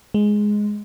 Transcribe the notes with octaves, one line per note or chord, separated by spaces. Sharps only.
G#3